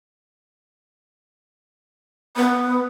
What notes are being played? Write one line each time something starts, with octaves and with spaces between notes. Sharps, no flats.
B3